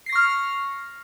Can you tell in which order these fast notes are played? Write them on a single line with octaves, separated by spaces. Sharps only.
C7 A#6 C#6 F6